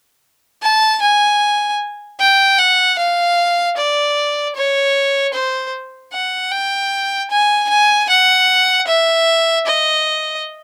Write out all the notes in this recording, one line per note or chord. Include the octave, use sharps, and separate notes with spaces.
A5
G#5
G5
F#5
F5
D5
C#5
C5
F#5
G5
G#5
G#5
F#5
E5
D#5